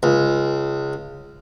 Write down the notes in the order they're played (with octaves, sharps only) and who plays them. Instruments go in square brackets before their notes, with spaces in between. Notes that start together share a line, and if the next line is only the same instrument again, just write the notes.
[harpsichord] C#2